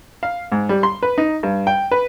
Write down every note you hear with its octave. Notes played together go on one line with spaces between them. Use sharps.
F5
G#2
G3
C6
B4
D#4
G2
G5
B4